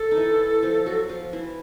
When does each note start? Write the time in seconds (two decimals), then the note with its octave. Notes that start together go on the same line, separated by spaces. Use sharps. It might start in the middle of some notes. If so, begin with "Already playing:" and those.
Already playing: A4
0.11 D#4
0.17 E3 E4
0.62 F3 F4
0.86 F#3 F#4
1.09 F3 F4
1.33 E3 E4